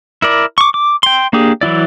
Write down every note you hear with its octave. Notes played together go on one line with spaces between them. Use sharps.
E4 A#4 D5
C#6 D6
D6
G5 C6
A#3 D4 G4 G#4
E3 F#3 E4 D5